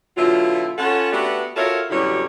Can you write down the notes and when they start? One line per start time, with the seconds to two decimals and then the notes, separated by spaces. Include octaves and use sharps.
0.17 B2 D3 F#3 E4 F4
0.78 C#4 F4 A4 C#5 F#5
1.13 A3 B3 D4 F#4 G4 B4
1.56 F4 F#4 A4 A#4 C#5 E5
1.90 F#2 B2 D3 G3 E4 C#5